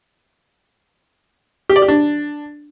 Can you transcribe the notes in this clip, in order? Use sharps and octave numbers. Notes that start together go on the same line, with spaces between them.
G4
D5
G4
D4